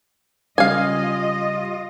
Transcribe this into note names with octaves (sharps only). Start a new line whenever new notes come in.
C#3 G3 F4 D#5 F5 G#5